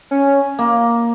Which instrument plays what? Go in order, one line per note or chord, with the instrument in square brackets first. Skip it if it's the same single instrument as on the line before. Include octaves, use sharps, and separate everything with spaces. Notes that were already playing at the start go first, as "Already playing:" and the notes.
[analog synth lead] C#4
[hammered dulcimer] A#3